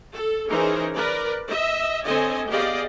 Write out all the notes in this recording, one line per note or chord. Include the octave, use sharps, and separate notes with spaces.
A4
E3 C#4 D#4 G#4 A#4 C5
A#4 B4 D5
D#5 E5
D3 C4 A4 C#5 D#5 G#5
B3 G4 G#4 D5 D#5 F5